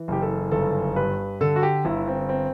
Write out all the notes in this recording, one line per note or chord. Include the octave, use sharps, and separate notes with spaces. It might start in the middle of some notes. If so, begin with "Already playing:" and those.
Already playing: E3
F#1 G4
A4
G1 A4
G2 B4
D3 A4
F#4
G4
G1 E4
C4
C4